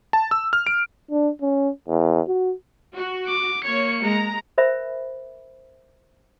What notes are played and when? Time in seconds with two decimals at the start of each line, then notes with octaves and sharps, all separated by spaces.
0.13 A5
0.31 E6
0.53 F6
0.67 D7
1.11 D4
1.42 C#4
1.88 E2
2.28 F#4
2.95 F#4
3.28 D6
3.64 A#3 C#5 C#7
4.01 G#3 A#5
4.58 A#4 C5 E5 B5